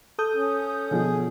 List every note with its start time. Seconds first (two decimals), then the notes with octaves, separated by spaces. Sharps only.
0.19 A4 D#6 G6
0.35 C#4
0.91 B2 D3 F3 G#4